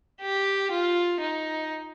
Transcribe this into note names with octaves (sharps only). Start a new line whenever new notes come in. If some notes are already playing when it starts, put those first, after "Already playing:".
G4
F4
D#4